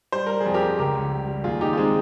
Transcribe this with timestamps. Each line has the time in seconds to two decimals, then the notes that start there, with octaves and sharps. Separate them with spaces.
0.12 G3 C5
0.27 G3 A#4
0.40 G#4
0.46 F2
0.54 G4 A#4
0.62 F2
0.79 C#2 G4 A#4
0.95 C#2
1.11 G3
1.28 G3
1.44 D#2 F4 G#4
1.61 D#2 D#4 G4
1.73 F4
1.77 G#3 C4 D#4